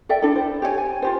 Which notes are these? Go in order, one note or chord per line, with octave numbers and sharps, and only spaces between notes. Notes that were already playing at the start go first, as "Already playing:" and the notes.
A4 D5 E5 G5
D4 E4 A4
C5
G4 C#5 F5 G#5
G#5
F4 G4 C5